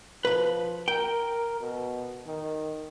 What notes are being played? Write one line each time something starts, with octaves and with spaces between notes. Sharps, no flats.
F3 B4 B5
A#4 G5
B2
D#3